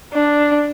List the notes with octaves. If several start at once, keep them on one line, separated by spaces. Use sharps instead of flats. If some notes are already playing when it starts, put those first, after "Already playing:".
D4